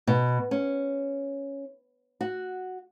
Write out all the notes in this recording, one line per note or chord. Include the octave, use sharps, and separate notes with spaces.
B2
C#4
F#4